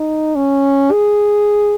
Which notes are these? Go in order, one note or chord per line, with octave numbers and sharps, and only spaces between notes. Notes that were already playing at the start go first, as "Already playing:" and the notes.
Already playing: D#4
C#4
G#4